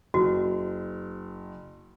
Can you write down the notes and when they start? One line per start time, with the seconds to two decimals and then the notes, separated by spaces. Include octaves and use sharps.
0.14 F#1 F#4